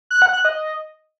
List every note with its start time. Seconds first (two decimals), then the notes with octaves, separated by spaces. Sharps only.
0.11 F#6
0.22 F#5
0.33 F#6
0.45 D#5